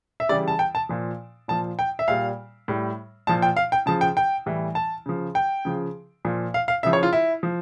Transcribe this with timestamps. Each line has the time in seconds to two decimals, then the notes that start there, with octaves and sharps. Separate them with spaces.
0.20 E5
0.29 C#3 E3 G3 D5
0.48 A5
0.59 G5
0.75 A5
0.89 A#2 F3
1.48 A#2 F3 A5
1.79 G5
1.99 E5
2.08 A#2 G3 F5
2.68 A2 G3
3.27 A#2 F3 A5
3.42 G5
3.57 F5
3.72 G5
3.86 C#3 F3 A5
4.01 G5
4.17 G5
4.46 A2 E3 G3
4.75 A5
5.06 C#3 F3
5.35 G5
5.65 C#3 F3
6.25 A#2 F3
6.54 F5
6.68 F5
6.83 C#3 F3 E5
6.93 C#5
7.03 F4
7.13 E4
7.43 F3